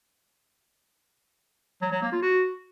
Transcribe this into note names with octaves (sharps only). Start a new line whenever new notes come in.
F#3
F#3
A#3
F4
F#4